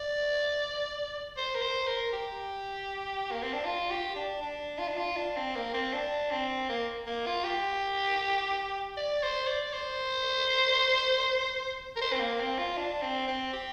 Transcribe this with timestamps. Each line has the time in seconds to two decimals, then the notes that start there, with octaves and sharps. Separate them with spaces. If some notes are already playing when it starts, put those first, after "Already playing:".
Already playing: D5
1.37 C5
1.55 A#4
1.62 C5
1.87 A#4
2.12 G4
3.31 A#3
3.42 C4
3.53 D4
3.65 F4
3.91 G4
4.16 D4
4.41 D4
4.78 F4
4.88 D4
4.97 F4
5.16 D4
5.37 C4
5.55 A#3
5.73 C4
5.93 D4
6.31 C4
6.69 A#3
7.06 A#3
7.26 F4
7.44 G4
8.97 D5
9.23 C5
9.47 D5
9.73 C5
11.96 A#4
12.01 C5
12.12 C4
12.20 A#3
12.39 C4
12.58 F4
12.77 D4
13.02 C4
13.27 C4
13.53 G4